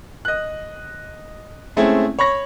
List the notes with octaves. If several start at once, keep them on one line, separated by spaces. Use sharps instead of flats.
D#5 F#6
G#3 A3 C4 C#4 E4 G#4
C#5 B5 C#6 A#6